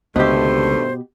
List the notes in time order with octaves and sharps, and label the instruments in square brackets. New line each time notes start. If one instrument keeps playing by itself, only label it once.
[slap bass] C#2 D3 [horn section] G2 D#3 A3 [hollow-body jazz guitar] B2 G4 [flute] C5